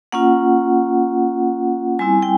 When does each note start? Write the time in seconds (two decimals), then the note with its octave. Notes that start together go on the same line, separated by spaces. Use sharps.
0.12 A#3 C#4 F4 F#5
1.99 G3 C4 E4 G#5
2.22 G5